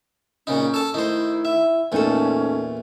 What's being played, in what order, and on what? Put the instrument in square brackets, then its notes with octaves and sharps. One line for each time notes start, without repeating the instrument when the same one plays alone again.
[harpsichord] A#2 C#3 D#4 [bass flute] C#4
[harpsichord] A4 A5
[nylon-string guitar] D#3 A3 [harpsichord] D#4 C5 [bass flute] E4
[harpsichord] E5
[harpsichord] E2 A#2 [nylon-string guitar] A3 D#4 A4 [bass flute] C#4